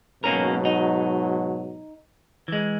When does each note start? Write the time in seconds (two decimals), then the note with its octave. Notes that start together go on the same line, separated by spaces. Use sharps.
0.24 G#2 B2 F#3 A#3 C#4 A#4
0.65 D#4
2.48 E3 G#3